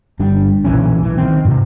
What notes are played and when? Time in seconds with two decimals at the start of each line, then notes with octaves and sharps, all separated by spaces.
0.19 G1 G3 D4
0.65 B1 A#2 E3 C#4
1.03 E3
1.18 D#3 C4
1.45 G#2 C3